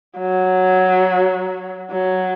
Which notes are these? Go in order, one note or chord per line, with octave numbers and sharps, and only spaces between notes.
F#3
F#3